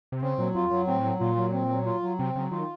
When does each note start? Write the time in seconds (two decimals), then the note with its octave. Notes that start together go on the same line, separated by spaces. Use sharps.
0.12 C3
0.22 C#3 C4
0.38 A#2 F#3
0.55 F2 F4
0.70 F#2 F#3
0.87 A2 C4
1.04 F#3
1.20 A#2 F4
1.36 F#3
1.53 C4
1.70 F#3
1.86 F4
2.02 F#3
2.19 C3 C4
2.36 C#3 F#3
2.51 D#3 F4